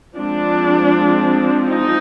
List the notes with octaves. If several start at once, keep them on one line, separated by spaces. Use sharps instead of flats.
F3 G#3 C4 D4
D#4